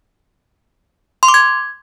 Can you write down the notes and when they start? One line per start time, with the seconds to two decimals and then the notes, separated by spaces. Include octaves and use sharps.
1.23 C6
1.28 D6
1.34 G#6